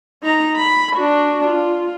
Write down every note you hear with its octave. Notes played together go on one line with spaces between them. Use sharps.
D#4 A#5
B5
D4 F#4
F4